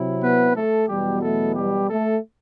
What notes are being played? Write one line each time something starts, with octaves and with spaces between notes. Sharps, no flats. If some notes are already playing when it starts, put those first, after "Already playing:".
Already playing: C3 F#3 C4 E4
B3 B4
A3 A4
E2 B2 F#3 G3 B3 G4
A3 A4
G3 G4
A3 A4